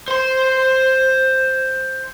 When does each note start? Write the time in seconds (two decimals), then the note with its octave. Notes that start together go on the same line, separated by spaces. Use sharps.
0.08 C5 C6